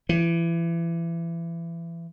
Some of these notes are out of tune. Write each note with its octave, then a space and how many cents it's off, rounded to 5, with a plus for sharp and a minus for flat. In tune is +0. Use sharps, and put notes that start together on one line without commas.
E3 +30